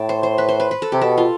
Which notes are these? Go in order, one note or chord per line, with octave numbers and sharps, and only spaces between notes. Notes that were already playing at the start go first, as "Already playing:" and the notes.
Already playing: A2 G5 A5
C5
C5
B4
C5
B4
B4
A4
C3 G4
B2 A4
F4